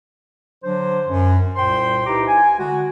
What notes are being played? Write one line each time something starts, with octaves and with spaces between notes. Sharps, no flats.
D3 F#3 D4 C5
F#2
C2 A#2 C5 G5 C6
D#4 E4 G4 B4 A#5 D6
G#5
D3 G#3 F#4